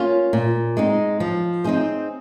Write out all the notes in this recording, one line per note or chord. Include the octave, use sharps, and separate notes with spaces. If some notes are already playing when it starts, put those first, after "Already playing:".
Already playing: A#3 C#4 F4
A#2
G#3 C4 D#4
F3
C4 D#4 G#4 C5